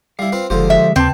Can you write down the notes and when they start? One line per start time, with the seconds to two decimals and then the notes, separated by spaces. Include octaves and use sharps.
0.19 G3 E4 F5
0.32 C4 F4 B4
0.50 F#1 D3 F3 G#3 F4 G4 C5
0.70 E5
0.96 D#2 C#3 C4 B4 A5